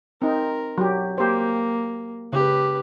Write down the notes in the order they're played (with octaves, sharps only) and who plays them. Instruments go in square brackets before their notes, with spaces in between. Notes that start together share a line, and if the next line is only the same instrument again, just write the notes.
[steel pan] C4 D#4 [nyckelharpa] A#4
[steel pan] F#3 G4
[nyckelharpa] A#3 [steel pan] G4 C5
[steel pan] C#3 [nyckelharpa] G4 B4